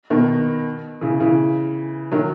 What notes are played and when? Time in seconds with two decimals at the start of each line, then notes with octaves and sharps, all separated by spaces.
0.10 B2 D#3
1.01 C#3 E3
1.20 C#3 E3
2.12 D#3 F#3